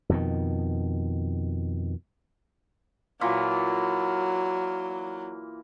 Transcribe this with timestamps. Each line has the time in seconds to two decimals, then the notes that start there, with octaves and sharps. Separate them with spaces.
0.09 F2 B2 D#3
3.21 A#2 E3 F#3 F4